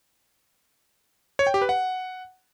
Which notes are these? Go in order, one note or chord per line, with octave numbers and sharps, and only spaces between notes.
C#5
G5
G4
B4
F#5